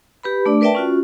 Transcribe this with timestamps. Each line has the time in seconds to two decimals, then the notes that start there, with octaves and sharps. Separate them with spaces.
0.23 G4 B4 B5
0.46 A3 D4 D5
0.61 A#4 B4 D5 E5 G5 A5
0.75 C#4 F4 F#4